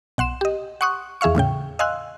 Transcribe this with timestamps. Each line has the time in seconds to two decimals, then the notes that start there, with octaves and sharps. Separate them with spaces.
0.18 B1 F#5 C6 E7
0.41 G4 D#5
0.81 F#5 C6 C#6 D#6 F#6
1.21 E2 G#4 E5 F5 C#6
1.35 E2 A2 C#3 G5
1.79 D#5 F5 G#5 C6 E6 F#6